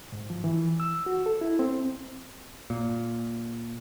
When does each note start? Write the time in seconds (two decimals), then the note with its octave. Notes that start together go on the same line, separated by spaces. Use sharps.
0.12 G#2
0.30 F3
0.44 E3
0.80 E6
1.06 F#4
1.26 A4
1.41 E4
1.59 C4
2.70 A#2